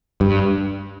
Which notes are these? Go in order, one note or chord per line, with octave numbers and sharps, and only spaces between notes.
G2